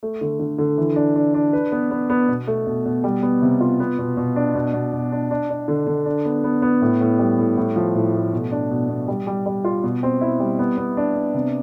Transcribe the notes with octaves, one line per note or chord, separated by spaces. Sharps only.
A3
D3
D3
D3
E3
D4
D4
D4
B4
B3
B3
B3
B2
A3
B2
B2
G3
B3
C3
F4
B3
B2
B2
D4
B2
B2
B2
D4
D4
D4
D3
D3
D4
B3
B3
B3
A2
A2
G3
A2
A2
F3
A2
A3
B2
D4
B2
B2
G3
G3
G3
F4
B2
C4
E4
G3
B3
B3
D4
B3
C3